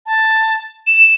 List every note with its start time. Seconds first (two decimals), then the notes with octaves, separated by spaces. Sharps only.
0.06 A5
0.87 E7